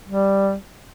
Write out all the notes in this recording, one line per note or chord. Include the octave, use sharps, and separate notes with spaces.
G3